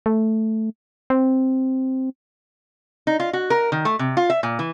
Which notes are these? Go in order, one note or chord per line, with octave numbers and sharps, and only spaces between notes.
A3
C4
D#4
F4
F#4
A#4
D#3
A3
C3
F4
E5
A#2
E3